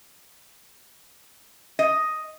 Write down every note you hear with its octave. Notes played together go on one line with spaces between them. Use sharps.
D#5